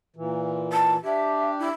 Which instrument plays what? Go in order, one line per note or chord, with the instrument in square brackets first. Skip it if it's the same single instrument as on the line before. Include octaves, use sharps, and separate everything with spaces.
[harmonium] A#2 E3
[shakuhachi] A5
[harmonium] D4 G4 [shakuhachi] E5
[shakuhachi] E4